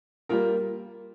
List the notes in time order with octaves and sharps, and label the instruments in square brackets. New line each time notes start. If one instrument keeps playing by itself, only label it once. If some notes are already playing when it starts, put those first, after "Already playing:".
[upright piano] G3 A#3 F4 A#4